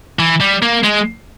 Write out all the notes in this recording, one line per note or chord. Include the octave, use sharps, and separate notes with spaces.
E3
G3
A#3
G#3